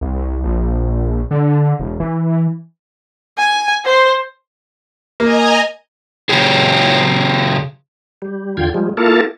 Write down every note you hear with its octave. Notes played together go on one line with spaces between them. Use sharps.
C2
A#1
D3
E1
E3
G#5
C5
A#3 D#5 G#5 A#5
C#3 F#3 G4 G#4
G3
E2 D3 F4 G5 G#6
F3 G3 G#3
A#3 E4 F4 A4 A#4 A5